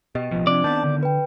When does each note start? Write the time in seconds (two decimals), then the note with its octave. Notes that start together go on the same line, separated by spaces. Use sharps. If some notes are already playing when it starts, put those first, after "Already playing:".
0.15 B2 G4 D#5
0.31 A1 B2 F3
0.47 C3 C4 D4 D5
0.64 D#3 B3 A5 G6
0.84 D3
1.03 B4 G5